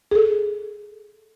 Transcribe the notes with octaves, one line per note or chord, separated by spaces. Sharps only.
G#4 A4